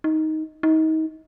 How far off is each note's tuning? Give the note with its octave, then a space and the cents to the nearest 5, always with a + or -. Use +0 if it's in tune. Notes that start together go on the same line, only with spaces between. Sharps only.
D#4 +10
D#4 +30